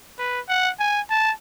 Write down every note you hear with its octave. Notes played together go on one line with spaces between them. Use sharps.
B4
F#5
G#5
A5